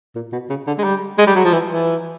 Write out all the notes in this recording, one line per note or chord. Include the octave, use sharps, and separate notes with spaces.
A#2
B2
C#3
D3
G#3
G3
G#3
G3
F#3
F3
E3
E3